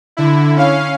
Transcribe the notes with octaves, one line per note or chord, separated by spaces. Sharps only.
D3 E4
C#4 F5